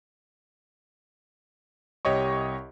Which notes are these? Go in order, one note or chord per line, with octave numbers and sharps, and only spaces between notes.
C2 G4 C#5 D#5 C#6